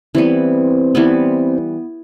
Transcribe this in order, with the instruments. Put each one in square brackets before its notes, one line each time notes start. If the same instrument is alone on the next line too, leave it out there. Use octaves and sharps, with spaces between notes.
[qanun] E3 G3 B3 [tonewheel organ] C4
[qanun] E3 G3 B3